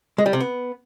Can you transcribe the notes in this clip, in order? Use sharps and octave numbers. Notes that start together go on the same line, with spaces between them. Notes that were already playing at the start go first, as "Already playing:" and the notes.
G#3
G3
C3
B3